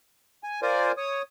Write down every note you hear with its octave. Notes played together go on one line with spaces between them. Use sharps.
G#5
F4 A#4 C5 D5 G#5
C#5 D#6